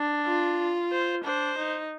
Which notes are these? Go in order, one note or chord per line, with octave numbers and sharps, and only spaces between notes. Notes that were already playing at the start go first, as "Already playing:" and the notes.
Already playing: D4
F4
C5
D4 C5
D#4